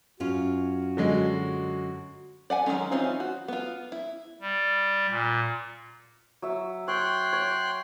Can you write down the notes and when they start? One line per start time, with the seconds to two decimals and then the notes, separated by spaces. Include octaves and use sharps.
0.20 F#2 C#4 F4 F#4
0.97 D3 F#3 G#3
2.50 D5 F#5 G#5
2.66 D#3 F3 F#3 G#3 C#4
2.91 E3 C4 C#4 D#4 F4
3.20 F#4
3.48 B3 F4
3.92 E4
4.41 G3
5.09 A#2
6.42 F#3 E5
6.88 C#5 G5 C6 F#6
7.33 C#5